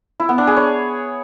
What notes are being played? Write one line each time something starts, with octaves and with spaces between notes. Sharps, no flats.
E4
B3
D4
G#4
C#5